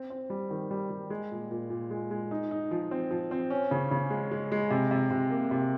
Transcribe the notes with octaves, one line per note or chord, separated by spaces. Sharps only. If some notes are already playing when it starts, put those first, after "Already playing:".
Already playing: C4
C4
G3
D#3
G3
G3
G#3
A#2
A#2
A#2
G#3
G#3
D#4
D#4
F3
C4
F3
C4
C#4
C#3
C#3
G#3
G#3
G#3
C3
C3
C3
A#3
C3